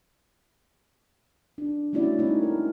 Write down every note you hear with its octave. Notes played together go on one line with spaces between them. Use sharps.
D4
G3 A3 C#4 E4 F#4 D5
G#3 A3 C4 C#4 D#4 C#5
A#4